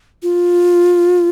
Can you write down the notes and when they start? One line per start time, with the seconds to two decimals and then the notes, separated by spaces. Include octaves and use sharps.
0.23 F4